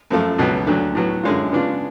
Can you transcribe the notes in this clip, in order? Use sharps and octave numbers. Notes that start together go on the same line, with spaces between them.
F#2 F3 A3 F4
C#2 B2 F#3 B3
D2 D3 F#3
A2 F#3 B3
F#2 D3 G#3 C#4 F4
C#3 G#3 B3 D4 F4